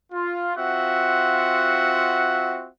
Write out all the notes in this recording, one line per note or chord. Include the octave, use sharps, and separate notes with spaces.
F4
C4 F4 F#4 E5 F#5